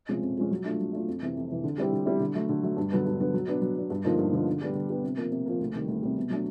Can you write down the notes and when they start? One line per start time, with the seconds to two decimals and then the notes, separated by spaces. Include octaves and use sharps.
0.09 C3 F3 G#3 C#4
0.23 F2
0.37 C3 F3 G#3 C#4
0.51 F#3
0.65 A3 D4 F4
0.80 F#3
0.93 A3 D4 F4
1.08 F2
1.22 C3 E3
1.36 F2
1.50 C3 E3
1.64 D3
1.78 G3 C4 E4 G4
1.93 D3
2.06 G3 C4 E4 G4
2.20 D3
2.35 F#3 A3
2.49 D3
2.63 F#3 A3
2.77 G2
2.92 D3 F#3 B3
3.06 G2
3.20 D3 F#3 B3
3.34 F#3
3.48 B3 D4
3.61 F#3
3.76 B3 D4
3.90 G2
4.04 D3 F3 A#3 D#4
4.19 G2
4.33 D3 F3 A#3 D#4
4.47 D3
4.61 G3 B3 D4 G4
4.75 D3
4.89 G3 B3 D4 G4
5.04 C3
5.17 F3 A#3
5.32 C3
5.46 F3 A#3
5.60 D2
5.74 C3 D#3 G3
5.88 D2
6.02 C3 D#3 G3
6.16 B2
6.30 F#3 A3 D4